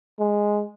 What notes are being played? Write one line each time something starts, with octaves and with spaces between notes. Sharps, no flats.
G#3